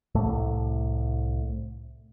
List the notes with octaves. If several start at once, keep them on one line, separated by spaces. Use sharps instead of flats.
C2 A2 A3